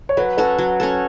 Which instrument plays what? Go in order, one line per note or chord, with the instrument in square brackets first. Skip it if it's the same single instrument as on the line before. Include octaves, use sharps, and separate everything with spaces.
[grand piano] C#5
[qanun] F#3 [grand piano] B4
[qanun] C#4 F#4 A4 [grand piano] B4
[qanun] F#3
C#4 F#4 A4